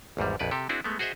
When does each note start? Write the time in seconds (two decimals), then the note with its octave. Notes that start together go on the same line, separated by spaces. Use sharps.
0.17 G#1 E2 G#2 G3
0.39 A#1 F2 B4 D5
0.51 C3 G4 A4
0.69 C4 D4 E4 F#4 G#4
0.84 G#3 A3 B3
0.99 F#4 G#4 C5 D#5 E5